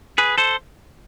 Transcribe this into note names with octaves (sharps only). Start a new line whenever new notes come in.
G#4 B4
A4 C5